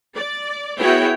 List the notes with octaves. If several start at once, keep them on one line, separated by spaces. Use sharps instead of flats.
D5
B3 E4 F#4 G#4 C#5 G5